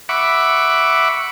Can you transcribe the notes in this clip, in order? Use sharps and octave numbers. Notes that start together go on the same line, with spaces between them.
E5 F#5 B5 C#6 D6